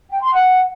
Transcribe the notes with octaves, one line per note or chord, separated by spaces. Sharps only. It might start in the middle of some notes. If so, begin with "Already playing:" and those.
G5
C6
F#5